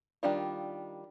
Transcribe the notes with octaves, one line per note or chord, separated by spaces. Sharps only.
D#3 G3 D4 F4